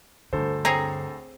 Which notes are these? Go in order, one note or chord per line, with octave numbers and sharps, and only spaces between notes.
D2 G2 D3 A4 C5
C4 G#4 C#5 A#5